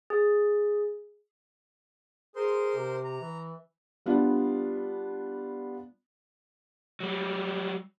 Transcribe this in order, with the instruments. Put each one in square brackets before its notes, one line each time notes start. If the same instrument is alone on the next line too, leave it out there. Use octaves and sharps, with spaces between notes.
[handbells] G#4
[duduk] G#4 [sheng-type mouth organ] A#4 C5 C6
[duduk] C3
[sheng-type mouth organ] A#5
[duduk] E3
[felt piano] G3 B3 D4 F4
[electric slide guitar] F#3 G3